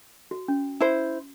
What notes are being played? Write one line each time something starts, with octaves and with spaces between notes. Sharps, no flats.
F#4
C#4
E4 C5